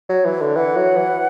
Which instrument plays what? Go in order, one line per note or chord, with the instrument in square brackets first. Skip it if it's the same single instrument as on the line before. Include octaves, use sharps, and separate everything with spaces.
[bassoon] F#3
E3
D3
[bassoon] E3 [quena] F#5
[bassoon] F#3
E3